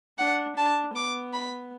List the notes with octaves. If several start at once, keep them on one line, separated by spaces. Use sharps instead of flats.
D4 F#5
D4 A5
B3 D6
B5